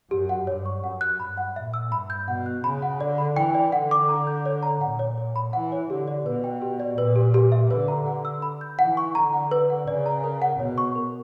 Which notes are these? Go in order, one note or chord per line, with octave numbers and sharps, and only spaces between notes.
F#2 G4
F#5
G2 C#5
C#6
F#2 F#5
F#6
G2 B5
F#5
A#2 E5
E6
G2 B5
G6
B2 F#5
F#6
C#3 B5
F#5
D3 D5
B5
E3 G5
D5
D3 F#5
D6
A#5
G6
C#5
A#5
A#2 F#5
C#5
C#5
B5
E3 F#5
C#5
D3 G4
D5
B2 B4
G5
G4
D5
A#2 B4
G4
G4
E5
D3 B4
A#5
D3 F#5
E6
B5
G6
E3 F#5
C#6
D3 A#5
F#5
B4
F#5
C#3 D5
A#5
A#4
F#5
B2 C#5
C#6
A#4